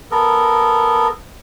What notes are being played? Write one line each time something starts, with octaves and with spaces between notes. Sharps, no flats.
B3 A4 A#4